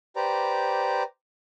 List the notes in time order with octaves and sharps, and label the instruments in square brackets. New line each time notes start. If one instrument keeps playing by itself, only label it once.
[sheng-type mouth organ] G4 B4 C5 D5 A#5